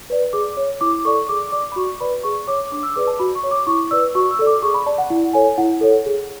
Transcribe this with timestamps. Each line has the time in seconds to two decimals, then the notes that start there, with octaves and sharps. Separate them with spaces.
0.10 B4 D5
0.33 G#4 D6
0.57 C#5
0.81 E4 D6
1.05 A4 D5 C#6
1.29 G#4 D6
1.52 D5 D6
1.72 B5
1.76 F#4 C#6
2.00 B4 D5 B5
2.23 G#4 C#6
2.48 C#5 D6
2.72 D4 D6
2.83 E6
2.96 G#4 B4 D5 D6
3.07 A5
3.19 F#4 B5
3.35 C#6
3.43 C#5
3.51 D6
3.67 E4 C#6
3.91 B4 D5 E6
4.15 F#4 C#6
4.31 E6
4.39 A4 D5
4.47 D6
4.63 G#4 C#6
4.74 B5
4.86 D5 A5
4.98 F#5
5.10 E4 F#5
5.33 A4 C#5 G#5
5.58 E4 F#5
5.81 A4 C#5
6.06 G#4